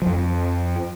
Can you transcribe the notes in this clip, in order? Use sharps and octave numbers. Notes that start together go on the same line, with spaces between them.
F2 F3